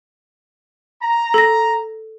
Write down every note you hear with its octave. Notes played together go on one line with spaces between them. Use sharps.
A#5
A4 A#6